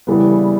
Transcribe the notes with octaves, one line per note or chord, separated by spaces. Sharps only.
C#3 E3 G3 B3